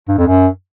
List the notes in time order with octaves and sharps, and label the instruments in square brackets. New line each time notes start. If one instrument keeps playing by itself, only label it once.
[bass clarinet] G2
F2
F#2